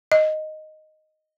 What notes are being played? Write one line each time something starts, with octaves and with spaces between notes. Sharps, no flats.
D#5